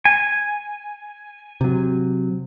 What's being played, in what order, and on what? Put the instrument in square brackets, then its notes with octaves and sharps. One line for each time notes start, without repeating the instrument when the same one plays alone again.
[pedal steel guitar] G#5
[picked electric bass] C3 F#3